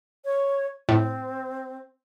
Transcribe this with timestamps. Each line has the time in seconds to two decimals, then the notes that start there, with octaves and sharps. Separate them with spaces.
0.25 C#5
0.89 A2 C4